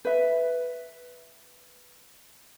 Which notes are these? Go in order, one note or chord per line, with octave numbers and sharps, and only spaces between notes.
B4 E5